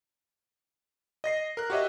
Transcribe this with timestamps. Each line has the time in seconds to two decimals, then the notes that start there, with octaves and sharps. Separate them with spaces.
1.24 D#5 A#6 C7
1.57 A#4 F#6
1.70 F#4 G4 C#5 D#5 E5